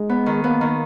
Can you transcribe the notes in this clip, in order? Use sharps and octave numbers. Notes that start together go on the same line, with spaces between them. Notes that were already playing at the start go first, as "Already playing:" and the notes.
Already playing: G#3 D#4
B3
D#3
A#3 B3
D#3